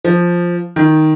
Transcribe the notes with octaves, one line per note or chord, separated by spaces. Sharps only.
F3
D#3